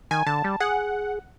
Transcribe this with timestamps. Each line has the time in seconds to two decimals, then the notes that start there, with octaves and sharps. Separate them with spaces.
0.11 D#3 G#5
0.27 D3 A5
0.44 G3
0.60 G#4 F#5